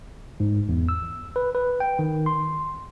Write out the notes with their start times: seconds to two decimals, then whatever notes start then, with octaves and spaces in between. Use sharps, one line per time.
0.40 G#2
0.69 E2
0.89 E6
1.36 B4
1.55 B4
1.80 G5
1.99 D#3
2.26 C6